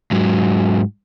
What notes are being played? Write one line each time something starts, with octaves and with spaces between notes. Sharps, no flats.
G#2 F#3